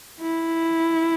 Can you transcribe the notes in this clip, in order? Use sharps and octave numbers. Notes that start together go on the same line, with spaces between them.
E4